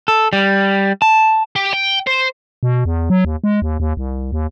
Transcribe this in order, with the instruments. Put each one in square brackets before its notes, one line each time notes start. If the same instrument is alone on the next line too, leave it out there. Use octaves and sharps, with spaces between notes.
[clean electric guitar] A4
G3
A5
[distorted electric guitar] G4
G5
C5
[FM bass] B2
E2
F#3
D#2
G#3
D#2
D#2
C2
D#2